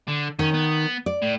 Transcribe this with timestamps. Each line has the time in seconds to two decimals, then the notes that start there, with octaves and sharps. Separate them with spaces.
0.08 D3
0.39 D#3 C#4
0.54 B3
1.06 D5
1.22 A2